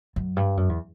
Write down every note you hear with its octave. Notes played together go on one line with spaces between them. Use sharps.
F#2
G2
F#2
E2